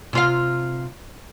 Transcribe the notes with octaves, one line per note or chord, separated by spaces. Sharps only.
C3 F4 F5